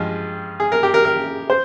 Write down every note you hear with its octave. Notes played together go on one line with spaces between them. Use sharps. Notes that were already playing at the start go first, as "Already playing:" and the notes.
Already playing: G2 F3 G#3
G#4
A#4
G4
A#4
A#4
C5